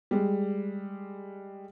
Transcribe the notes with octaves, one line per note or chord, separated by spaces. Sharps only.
G3 G#3